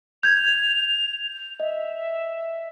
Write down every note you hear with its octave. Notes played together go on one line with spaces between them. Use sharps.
G6 G#6 F7
D#5 E5